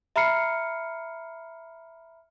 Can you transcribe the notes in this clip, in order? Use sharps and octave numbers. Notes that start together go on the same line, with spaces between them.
E5 A#5 B5 F6 C7 C#7